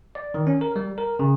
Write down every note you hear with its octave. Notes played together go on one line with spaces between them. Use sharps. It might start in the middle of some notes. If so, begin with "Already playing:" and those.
D5
D#3
C#4
A#4
G3
A#4
C#3